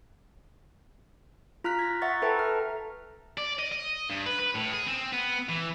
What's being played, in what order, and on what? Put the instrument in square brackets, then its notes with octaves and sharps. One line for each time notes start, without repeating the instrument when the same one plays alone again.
[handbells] F4 A#5 F6 F#6 B6
G#6 A#6
E5 F#5 C#6 A6
A4 B4 E5 G5 A5 A#5
A4 F6 A#6
[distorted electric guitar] D5
D#5
D#5
G2
B4
B4
A2
G#4
C4
B3
E3